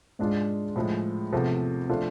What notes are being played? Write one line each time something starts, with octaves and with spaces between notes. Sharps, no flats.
G#2 G#3 D4 F4
A2 F3 G#3
E2 C3 F3 A3
F3 A3 D4 F4